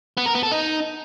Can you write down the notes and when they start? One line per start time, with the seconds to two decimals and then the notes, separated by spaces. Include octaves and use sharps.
0.17 B3
0.26 A#4
0.34 B3
0.43 A4
0.52 D#4